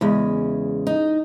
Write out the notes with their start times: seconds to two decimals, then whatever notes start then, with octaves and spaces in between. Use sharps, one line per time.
0.01 E2 C#3 G#3
0.87 D#4